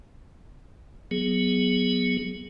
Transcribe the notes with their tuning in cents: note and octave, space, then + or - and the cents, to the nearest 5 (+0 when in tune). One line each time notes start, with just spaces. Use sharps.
F#3 +0 B3 +0 G#4 +0